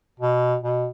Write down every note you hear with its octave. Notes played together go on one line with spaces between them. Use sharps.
B2
B2